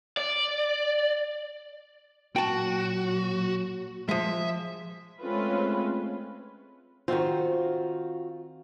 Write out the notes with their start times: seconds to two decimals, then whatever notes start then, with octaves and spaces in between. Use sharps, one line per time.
0.17 D5
2.36 A#2 F#3 F#4 G5 A5
4.09 F3 G#3 E5
5.22 G#3 A3 C4 C#4 F4 B4
7.08 D#3 C4 F4 F#4